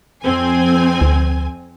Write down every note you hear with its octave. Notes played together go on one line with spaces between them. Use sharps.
F2 C4 G#5
D2